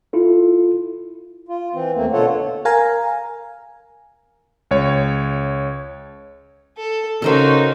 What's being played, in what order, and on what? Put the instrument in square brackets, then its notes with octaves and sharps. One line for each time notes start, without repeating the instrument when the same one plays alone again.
[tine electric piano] E4 F4 A4
[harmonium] F4
E3 C4
E2 A3 A#3 C4
B2 D3 F4 A4 C#5 F#5
[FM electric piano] A#4 F5 G#5 A#5
[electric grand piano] C#2 C#5
[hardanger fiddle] A4
[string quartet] C#3 [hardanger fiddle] D#4 F#4 [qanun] A4 A#4 C5